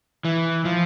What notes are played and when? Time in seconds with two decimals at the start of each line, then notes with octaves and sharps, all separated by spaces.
0.25 E3
0.65 F3